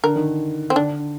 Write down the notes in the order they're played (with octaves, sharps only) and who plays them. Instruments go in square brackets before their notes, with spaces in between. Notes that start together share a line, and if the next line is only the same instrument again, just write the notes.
[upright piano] D3 [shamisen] A#4
[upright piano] D#3
[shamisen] C4
[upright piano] D3 [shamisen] D4